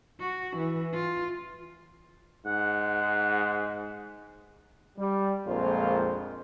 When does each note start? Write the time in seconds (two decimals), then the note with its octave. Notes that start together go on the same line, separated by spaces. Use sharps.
0.20 F#4
0.57 E3
0.93 F4
2.46 G#2 F#5
4.98 G3
5.47 A#1 F2 G#3 A#3 F4 C5